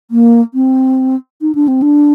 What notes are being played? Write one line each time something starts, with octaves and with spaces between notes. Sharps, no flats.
A#3
C4
D#4
D4
C4
D4